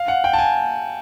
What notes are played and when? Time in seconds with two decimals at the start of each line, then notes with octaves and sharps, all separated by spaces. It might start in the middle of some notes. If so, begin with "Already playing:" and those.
Already playing: F5
0.08 F#5
0.24 G5
0.33 A5
0.38 G#5